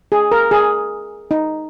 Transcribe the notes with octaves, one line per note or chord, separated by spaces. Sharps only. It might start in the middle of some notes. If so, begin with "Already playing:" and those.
G#4
A#4
G#4
D#4